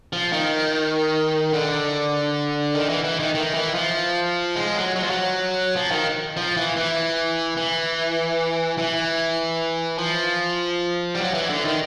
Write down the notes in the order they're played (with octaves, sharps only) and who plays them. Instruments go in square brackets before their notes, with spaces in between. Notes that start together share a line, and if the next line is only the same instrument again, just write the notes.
[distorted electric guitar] F3
D#3
D3
D#3
E3
E3
D#3
D#3
E3
F3
G#3
F#3
F#3
F3
F#3
F3
D#3
F3
E3
E3
E3
E3
F3
G3
F#3
E3
D3
D#3